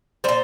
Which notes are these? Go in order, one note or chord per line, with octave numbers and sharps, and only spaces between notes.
A#2 G3 C5